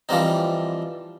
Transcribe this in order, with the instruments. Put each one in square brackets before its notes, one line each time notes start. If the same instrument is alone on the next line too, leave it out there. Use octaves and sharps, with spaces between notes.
[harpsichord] E3 F3 G3 C4 D#4